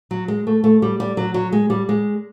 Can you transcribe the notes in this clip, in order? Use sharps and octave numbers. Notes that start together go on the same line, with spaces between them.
F#3
G#3
A3
A3
G3
G3
F#3
F#3
G#3
G3
G#3